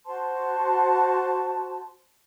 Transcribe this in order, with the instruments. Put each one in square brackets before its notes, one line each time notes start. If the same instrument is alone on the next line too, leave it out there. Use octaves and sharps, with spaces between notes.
[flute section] F#4 C5 A5 C6